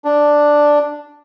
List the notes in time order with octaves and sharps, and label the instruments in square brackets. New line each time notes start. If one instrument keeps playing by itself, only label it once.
[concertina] D4